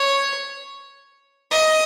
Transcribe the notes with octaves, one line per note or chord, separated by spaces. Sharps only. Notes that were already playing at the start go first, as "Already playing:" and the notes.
Already playing: C#5
D#5